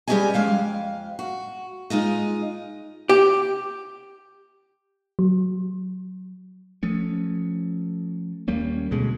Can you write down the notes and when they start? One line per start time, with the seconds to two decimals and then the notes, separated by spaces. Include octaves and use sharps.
0.08 G3 C#4 G4 G#4 D#5 G#5
0.34 F2 G#3 F5 G5
1.19 F#4
1.90 G#3 D#4 F4 D#5
3.09 G4
5.19 F#3
6.83 F3 A3 C#4
8.48 D#2 G3 A#3 C#4
8.91 D2 B2 G#3 A3